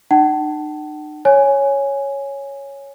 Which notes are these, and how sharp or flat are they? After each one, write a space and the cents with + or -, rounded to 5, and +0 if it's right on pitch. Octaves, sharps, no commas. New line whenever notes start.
D#4 -45 F#5 +40 A5 +0
C#5 +0 G#5 +0